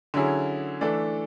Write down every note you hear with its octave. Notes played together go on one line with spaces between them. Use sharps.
D3 F#3 C#4 E4 G#4
E3 A3 D4 A4